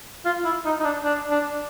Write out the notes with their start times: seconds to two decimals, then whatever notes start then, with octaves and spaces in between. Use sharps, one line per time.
0.26 F4
0.45 E4
0.65 D#4
0.80 D#4
0.84 D4
1.05 D4
1.31 D4